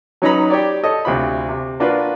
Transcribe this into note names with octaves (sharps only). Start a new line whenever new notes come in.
F#3 C#4 D#4 B4 A#5 B5
G4 C#5 D5
A4 C#5 D#5
D2 C3 F4 B5
C3
A#3 D4 F4 F#4 B4